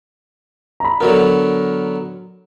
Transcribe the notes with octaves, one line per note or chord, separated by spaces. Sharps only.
A#5 B5
D3 F#3 B3 A#4